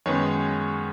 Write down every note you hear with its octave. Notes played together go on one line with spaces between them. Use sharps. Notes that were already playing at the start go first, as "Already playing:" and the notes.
F#2 D#3 G#3 B3 C#5